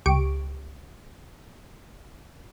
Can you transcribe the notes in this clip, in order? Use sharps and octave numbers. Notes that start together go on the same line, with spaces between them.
C#2 G4 C#6 D7